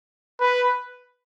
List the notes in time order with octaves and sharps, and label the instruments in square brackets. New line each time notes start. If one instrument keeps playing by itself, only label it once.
[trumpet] B4